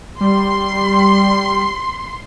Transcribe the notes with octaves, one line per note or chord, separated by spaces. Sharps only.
G3 C6